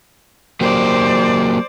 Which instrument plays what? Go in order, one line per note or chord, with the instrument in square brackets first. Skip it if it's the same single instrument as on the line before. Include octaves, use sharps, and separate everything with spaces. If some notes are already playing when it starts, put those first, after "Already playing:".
[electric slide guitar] F#3 A#3 G4 [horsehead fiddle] C5 D5